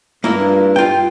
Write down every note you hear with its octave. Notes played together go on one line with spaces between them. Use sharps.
G2 A#3 E4 F4
F4 G5